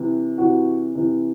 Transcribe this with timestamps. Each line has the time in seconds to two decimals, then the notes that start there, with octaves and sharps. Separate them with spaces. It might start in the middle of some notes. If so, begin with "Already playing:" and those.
Already playing: C3 E3
0.38 C3 E3 F#4
0.95 C3 E3